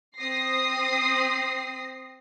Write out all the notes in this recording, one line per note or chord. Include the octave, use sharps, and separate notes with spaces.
C4 D#6 A#6 C7